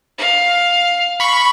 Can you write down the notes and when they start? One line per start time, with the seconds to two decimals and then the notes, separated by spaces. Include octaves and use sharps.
0.18 F5
1.20 B5 C#6